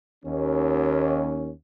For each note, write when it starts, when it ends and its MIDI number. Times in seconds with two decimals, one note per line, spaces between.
0.25 1.52 39
0.25 1.52 61